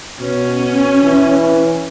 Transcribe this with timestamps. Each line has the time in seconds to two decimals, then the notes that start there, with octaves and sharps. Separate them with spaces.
0.20 B2 C#4
1.03 E3